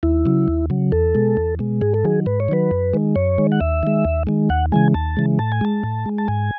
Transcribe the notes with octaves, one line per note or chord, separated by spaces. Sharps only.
D#2 E4
C#3 F#3
D#2
C#3 F#3
E2 A4
B2 G#3
E2
B2 G#3
G#2 G#4
A4
D#3 F#3 G#4
G#2 B4
C#5
D#3 F#3 B4
F#2
D#3 G#3
F#2 C#5
D#3 G#3
F#5
D#2 E5
D#3 G#3
D#2
D#3 G#3
D#2 F#5
C#3 E3 G#3 G#5
D#2 A5
C#3 E3 G#3
A2 A5
G#5
G#3 A5
A2
G#3
A5
G#2 G#5